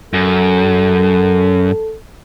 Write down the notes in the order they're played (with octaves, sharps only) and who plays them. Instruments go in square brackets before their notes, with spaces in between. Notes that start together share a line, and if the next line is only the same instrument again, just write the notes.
[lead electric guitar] F#2 [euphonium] A4